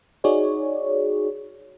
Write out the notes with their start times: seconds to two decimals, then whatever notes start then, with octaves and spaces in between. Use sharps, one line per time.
0.24 D#4 F#4 G#4 C#5 D5